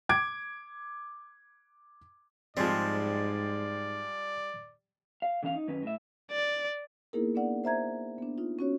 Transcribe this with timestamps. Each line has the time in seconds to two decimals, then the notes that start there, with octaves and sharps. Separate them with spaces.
0.09 D6 G#6 D7
2.57 G#2 F3 G3 G#3 C4 D5
5.22 F5
5.43 D3 E3 C#4 D4 F5
5.55 D#4
5.68 F#2 D#3 C#4 B4
5.83 A2 E5
6.31 D5
7.13 A#3 B3 D#4 E4 G#4 A#4
7.35 B3 D4 D5 F#5
7.64 C5 E5 A#5 G#6
8.18 B3 D4
8.38 D#4 F4
8.59 C#4 F#4 C#5